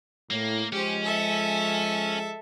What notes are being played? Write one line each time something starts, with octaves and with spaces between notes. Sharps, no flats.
A2 A#3
F3 G#3 C#4 G4 C5
A4 E5